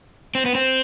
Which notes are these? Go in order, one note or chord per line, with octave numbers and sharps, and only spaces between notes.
C4
B3
C4